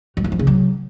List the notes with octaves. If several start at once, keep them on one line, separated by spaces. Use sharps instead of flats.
F#3
G2
F3
C#3
F#3